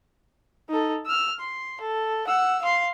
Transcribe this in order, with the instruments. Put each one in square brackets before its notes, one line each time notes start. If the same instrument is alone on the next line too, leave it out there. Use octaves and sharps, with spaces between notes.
[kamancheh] D#4 A4
E6 F6
C6
A4
F#5 E6
F5 C6